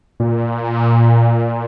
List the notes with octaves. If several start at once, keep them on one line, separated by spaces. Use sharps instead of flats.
A#2